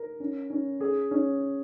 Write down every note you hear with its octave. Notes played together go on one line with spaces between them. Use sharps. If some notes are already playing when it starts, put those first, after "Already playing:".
Already playing: A#4
C#4
C#4
G#4
C#4